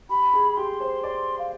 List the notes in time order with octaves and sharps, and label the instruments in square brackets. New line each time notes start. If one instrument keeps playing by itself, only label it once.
[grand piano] G4 [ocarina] B5
[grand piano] G#4
[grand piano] G4 [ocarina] C6
[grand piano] C5
[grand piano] D5 [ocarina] C6
[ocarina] F5